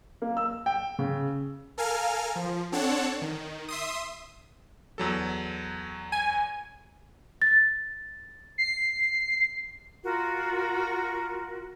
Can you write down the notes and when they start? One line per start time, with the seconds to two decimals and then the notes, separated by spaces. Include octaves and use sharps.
0.22 A#3
0.37 E6
0.66 G5
0.99 C#3
1.78 A4 A#4 F5 G#5 F6
2.36 F3
2.72 C4 D4 A4 C#5 F#5 A5
3.22 D#3
3.68 E5 C6 D#6
4.98 E2 F#3 A4
6.12 G#5
7.42 A6
8.58 C7
10.04 F4 F#4 A#4